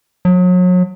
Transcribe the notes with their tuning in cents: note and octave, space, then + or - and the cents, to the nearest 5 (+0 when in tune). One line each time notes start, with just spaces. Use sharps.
F#3 -35